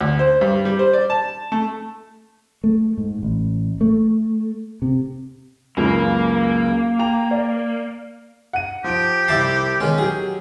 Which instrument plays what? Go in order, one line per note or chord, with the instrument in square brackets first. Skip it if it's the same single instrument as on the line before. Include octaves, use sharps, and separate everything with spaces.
[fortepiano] D2
C5
G2
G3
C5
D5
A5
A3
[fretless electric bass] A3
G#2
A1
A3
C3
[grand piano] C#2 F#2 C#3 [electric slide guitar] A#3
[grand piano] G5 A#5 F7
D5
[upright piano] F#5 D#7
[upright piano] F3 D7 [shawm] G4
[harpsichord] C2 E4 A5 [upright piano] E5 D6 C7
[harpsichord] D#3 C#4 [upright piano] G#3 B3
[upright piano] F#3 G4 [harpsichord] G#4